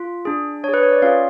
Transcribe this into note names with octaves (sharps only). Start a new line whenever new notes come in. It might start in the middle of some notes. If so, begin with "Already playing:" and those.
Already playing: F4
D4 G#4
D4 C#5
G#4 B4
C#5
D5
C#4 F4 G#4 F5